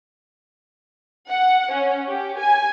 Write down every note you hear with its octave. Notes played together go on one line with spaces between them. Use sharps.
F#5
C#4
G4
G#5